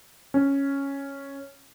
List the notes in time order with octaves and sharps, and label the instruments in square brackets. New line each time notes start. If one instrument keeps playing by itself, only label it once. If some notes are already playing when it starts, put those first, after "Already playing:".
[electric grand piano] C#4